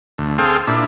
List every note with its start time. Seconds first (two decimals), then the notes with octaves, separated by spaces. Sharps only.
0.18 D2
0.38 C4 G#4 A4 F5 G5
0.67 A#2 D4 E4